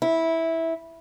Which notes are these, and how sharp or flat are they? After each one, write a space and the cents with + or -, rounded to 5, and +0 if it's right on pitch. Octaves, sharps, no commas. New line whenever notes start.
E4 -10